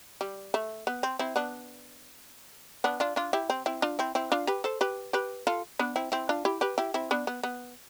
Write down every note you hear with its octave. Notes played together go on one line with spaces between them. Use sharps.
G3
A3
B3
C4
C4 E4
B3 D4
B3 D4
D4 F4
D4 F4
E4 G4
C4
C4 E4
D4 F4
C4 E4
C4 E4
D4 F4
G4 B4
A4 C5
G4 B4
G4 B4
F4 A4
B3 D4
C4 E4
C4 E4
D4 F4
E4 G4
G4 B4
E4 G4
C4 E4
B3 D4
B3
B3